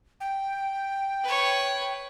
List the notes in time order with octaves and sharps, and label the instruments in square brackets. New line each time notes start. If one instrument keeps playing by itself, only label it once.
[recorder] G5
[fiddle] B4 C#5